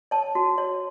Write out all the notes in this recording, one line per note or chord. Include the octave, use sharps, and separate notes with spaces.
C#5 A5
F#4
C#5